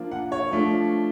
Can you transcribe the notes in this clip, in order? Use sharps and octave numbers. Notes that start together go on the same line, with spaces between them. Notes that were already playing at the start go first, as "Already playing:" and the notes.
Already playing: F3 A#3 D4 F4
F#5
C#5
F3 A3 D4 F4